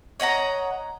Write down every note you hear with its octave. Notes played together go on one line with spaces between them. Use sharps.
C#5 D#5 F#5 A#5